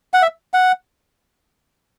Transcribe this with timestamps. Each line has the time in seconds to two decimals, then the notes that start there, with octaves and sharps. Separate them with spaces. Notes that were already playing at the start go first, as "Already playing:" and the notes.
0.14 F#5
0.22 E5
0.54 F#5